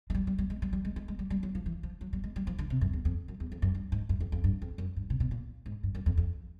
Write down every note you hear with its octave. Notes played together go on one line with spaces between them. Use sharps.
G#3
G3
G3
G3
G#3
G3
G3
G#3
G#3
G#3
G3
G3
F#3
F3
E3
F3
F#3
G3
G#3
G3
F3
D3
C3
F#2
E2
F2
F#2
E2
F2
F#2
G2
G#2
F#2
F2
F2
G2
F2
F#2
G2
C3
B2
A#2
G#2
G2
F#2
F2
F2